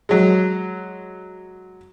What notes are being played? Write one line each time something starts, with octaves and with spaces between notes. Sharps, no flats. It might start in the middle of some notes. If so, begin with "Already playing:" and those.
F#3 G#3